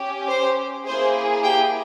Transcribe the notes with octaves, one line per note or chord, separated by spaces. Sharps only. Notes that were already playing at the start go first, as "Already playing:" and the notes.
Already playing: C#4 G4
C5
A#3 E4 G#4 C5
G4 G5